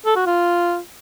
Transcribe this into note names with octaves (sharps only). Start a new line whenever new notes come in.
A4
F#4
F4